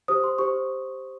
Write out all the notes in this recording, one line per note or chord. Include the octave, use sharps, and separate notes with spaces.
G4 C5 D#6
C6
G4 C5 C#6